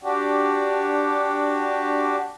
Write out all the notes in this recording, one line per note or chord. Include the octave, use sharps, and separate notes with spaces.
D4 F#4 G4